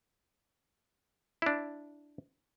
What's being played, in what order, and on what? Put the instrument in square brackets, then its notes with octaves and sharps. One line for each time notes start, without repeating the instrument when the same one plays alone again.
[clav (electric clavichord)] D4 E4